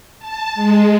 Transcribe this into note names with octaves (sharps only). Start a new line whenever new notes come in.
A5
G#3